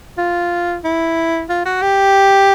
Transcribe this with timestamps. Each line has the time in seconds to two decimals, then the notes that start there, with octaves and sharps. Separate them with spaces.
0.18 F4
0.84 E4
1.49 F4
1.65 F#4
1.82 G4